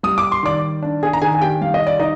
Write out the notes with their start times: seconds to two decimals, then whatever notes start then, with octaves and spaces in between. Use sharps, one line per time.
0.03 G3 D#6
0.18 D6
0.32 C6
0.43 D#3 D5 D6
0.83 D4
1.03 G#4 G#5
1.13 A#5
1.22 D#3 G#4 G#5
1.35 G#5
1.41 G4 G5
1.61 G3 F5
1.74 D#5
1.87 D5
2.00 D#4 D#5